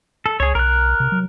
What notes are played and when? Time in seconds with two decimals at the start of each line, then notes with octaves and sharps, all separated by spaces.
0.26 A4
0.40 C#2 G#4 C#5
0.55 B1 A#4 F#6
1.00 C3
1.12 F#3